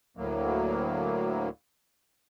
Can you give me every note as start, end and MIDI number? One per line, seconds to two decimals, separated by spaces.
0.17 1.49 38
0.17 1.49 45
0.17 1.49 54
0.17 1.49 58